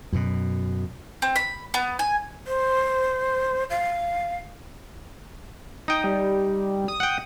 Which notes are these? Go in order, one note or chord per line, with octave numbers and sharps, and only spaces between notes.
F#2 B2
C4
B5
B3
G#5
C5
F5
D#4 G5 D#6
G3
D#6
F#5 G5